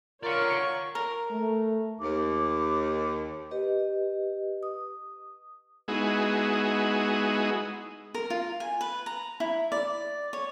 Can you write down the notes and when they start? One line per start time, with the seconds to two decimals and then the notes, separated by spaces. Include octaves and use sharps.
0.23 F4 A#4 C#5 D5 F#5 C#6
0.95 A#4
1.31 A3
2.00 D#2 D6
3.51 G4 B4 D#5
4.63 D#6
5.88 G#3 B3 D#4 E4 F#4 G#4
8.14 A#4
8.30 F4
8.60 G#5
8.81 B4
9.06 A#5
9.40 E4
9.72 D5
10.33 C#5